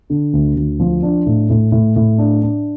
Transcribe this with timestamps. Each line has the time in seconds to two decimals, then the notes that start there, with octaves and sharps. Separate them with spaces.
0.10 D3
0.33 D2
0.56 D2
0.79 F3
1.03 D4
1.26 A2
1.50 A2
1.72 A2
1.96 A2
2.18 D4
2.42 D4